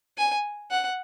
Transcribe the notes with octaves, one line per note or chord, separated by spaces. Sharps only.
G#5
F#5